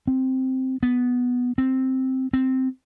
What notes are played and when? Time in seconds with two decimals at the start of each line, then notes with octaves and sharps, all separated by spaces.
0.07 C4
0.83 B3
1.58 C4
2.33 C4